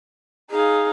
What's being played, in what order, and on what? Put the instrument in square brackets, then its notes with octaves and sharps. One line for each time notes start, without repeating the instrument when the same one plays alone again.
[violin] D#4 F5 [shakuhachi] G#4